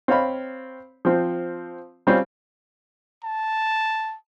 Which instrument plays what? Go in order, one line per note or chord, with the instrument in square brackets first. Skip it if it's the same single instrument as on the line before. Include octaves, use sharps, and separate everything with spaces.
[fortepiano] C4 C#5 F5 B5
F3 C4
G3 C4 C#4 F4
[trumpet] A5